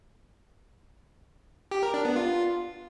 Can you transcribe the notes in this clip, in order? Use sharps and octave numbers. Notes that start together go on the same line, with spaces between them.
G4
A#4
D4
B3
F4